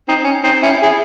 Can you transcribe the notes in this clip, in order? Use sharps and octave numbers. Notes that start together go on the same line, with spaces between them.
C4 D#4
C#4
C4 D#4
C#4 E4
E4 G#4